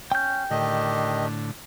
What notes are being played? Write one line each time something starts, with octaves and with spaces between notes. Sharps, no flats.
C#4 G5 G6
A2 D3 D#3 D4 G4 D#5